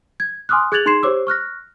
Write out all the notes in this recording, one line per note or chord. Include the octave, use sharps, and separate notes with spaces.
G#6
G#5 C6 D6 D#6 F6 F#6
G#4 F#6 G#6 A6 F7 F#7
D#4 G#4 C6 G#6 C7 E7
G4 C5 C#5 D6 E6
C#6 F6 F#6 A#6